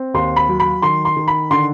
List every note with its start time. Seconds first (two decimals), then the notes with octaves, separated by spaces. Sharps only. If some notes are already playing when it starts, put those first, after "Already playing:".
Already playing: C4
0.14 D#2 C6
0.36 B5
0.48 F#3
0.60 B5
0.82 D#3 C6
1.05 C6
1.17 D#3
1.28 B5
1.51 D3 C6